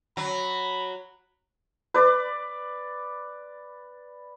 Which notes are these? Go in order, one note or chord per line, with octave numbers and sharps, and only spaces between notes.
F#3 B5
B4 D5